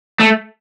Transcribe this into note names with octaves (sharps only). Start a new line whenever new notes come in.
A3